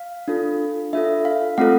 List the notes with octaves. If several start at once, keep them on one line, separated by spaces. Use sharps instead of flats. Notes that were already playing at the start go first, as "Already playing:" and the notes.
Already playing: F5
D4 F4 A4
D4 F4 A4 E5
F5
A3 C4 F4 A4 F#5